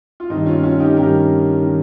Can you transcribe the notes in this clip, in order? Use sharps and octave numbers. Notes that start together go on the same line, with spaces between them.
F4
G2 D#3 C4 D#4
C#4 F4
C#4 F4
D#4 G4
G2 D#3 G4 A#4
D#3